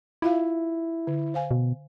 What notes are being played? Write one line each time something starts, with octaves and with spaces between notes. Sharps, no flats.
E4 F4 E5 F5
D3
C5 F5 G#5
B2